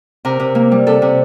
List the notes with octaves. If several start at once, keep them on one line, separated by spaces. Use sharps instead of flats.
C3 A#4
C3
A#3
G3
C3 A4
C3